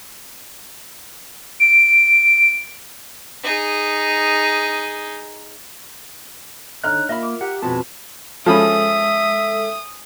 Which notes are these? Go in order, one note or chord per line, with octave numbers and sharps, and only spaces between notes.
D7
D#4 G#4
D3 D4 D#4 C#5 D#5 A#5 F6 F#6
A#3 F4 A#4 D#5 E5 B5
D6
G4 F#5 A#5
F2 B2 G#3 B3 C4 F#4 B4 A5
F3 G#3 C#4 A4 E5 B5 D#6